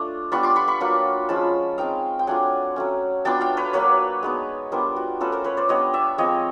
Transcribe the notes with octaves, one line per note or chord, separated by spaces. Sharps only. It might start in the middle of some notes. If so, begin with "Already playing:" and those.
Already playing: A3 D4 F4
G3 B3 D4 F4 B5 C#6
C6 D6
B5 C#6
B5 C#6
F#3 A#3 D4 F4
F3 G#3 C#4 F4 A5 B5
G#3 C4 D#4 F5 G5
G5
F#3 A3 D4 F4 F#5 G#5
F#3 A3 C#4
F#3 B3 D4 F4 G5 A5
F5 G5
B4 C#5
F#3 A#3 D4 B4 C#5
G#3 B3 D#4
G3 B3 D4 F4 A#4 C5
F#4
A3 C#4 F4 A4 B4
A#4 C5
B4 C#5
C5 D5
G3 B3 D4 C#5 D#5
D5 E5
F3 G#3 C4 C#5 D#5